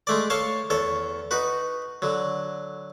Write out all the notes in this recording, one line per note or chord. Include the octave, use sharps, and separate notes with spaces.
G#3 A3 D5
A4 C#5 F5 A5 C#6
E2 A4 C#5
D#4 F#4 B4
D3 F#3